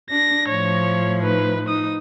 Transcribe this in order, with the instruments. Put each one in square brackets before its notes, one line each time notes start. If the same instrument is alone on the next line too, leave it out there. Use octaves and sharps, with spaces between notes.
[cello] D4 [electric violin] A#6
[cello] A2 F3 [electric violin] C#5
[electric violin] D#4 B4
D#4 D#6